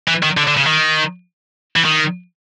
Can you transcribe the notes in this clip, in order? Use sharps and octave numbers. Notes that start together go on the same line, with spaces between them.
E3
D#3
D3
D3
C#3
D#3
E3
D#3